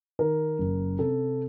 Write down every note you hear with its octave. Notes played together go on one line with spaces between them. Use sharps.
D#3 A#4
F#1
C3 A4